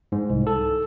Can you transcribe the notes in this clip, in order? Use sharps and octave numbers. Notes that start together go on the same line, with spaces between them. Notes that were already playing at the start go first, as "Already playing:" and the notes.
G#2
C2
A4